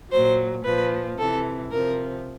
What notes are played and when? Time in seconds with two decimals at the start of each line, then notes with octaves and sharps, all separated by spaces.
0.12 A#2 F#3 C5
0.64 A#2 F3 B4
1.18 C3 E3 A4
1.72 C3 F3 A#4